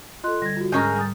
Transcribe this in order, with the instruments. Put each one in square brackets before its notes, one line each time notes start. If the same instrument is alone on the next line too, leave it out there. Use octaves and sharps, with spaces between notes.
[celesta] F4 C6 F#6 [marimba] A4 D#5
[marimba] D3 G3 [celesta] G#6 A#6
[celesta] F4 F#4
[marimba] G#2 [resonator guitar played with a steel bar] G#3 C#4 A#4 [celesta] A#5 G6
[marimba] G3 D#6 A6